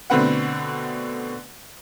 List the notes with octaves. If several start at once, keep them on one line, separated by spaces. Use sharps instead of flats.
B2 D3 A3 C4 B4 F#5